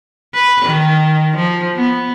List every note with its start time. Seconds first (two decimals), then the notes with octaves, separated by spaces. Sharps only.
0.34 B4
0.65 D#3
1.36 F3
1.76 B3